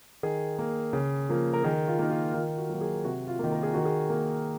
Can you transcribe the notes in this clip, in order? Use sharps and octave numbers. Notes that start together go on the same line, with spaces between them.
D#3 G#4
A#3
C#3
F3 A#3
A#4
D#3 G#4
F4
A#3 D#4
F4
D#3 F4
F#4
F#3 A#3
G#4
C3 F#4
F4
D#3 A#3
A#4
G#4
D#3 F#4
G#4
A#3